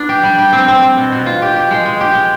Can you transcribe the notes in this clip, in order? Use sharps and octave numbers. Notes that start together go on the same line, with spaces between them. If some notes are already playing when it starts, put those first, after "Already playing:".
Already playing: B3 D4
G4
G3
G4
C4
C4
C4
B2
B2
F4
G4
G4
G#3
G#3
G4
G#3